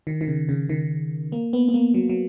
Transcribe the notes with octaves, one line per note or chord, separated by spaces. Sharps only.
D#3
D#3
C#3
C#3
D#3
A#3
B3
B3
A#3
F#3
F#3